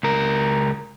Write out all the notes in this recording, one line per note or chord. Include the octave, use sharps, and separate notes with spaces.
C#2 A#4